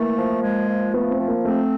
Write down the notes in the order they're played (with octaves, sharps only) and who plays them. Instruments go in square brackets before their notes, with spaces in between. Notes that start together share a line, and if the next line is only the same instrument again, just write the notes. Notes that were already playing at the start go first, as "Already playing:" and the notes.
Already playing: [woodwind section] E3 A3 [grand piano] A#3
[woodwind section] F3
G#3
F3
[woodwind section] A3 [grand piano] B3
[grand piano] C4
[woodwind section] F3
[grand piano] A#3
[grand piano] A3 [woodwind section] C4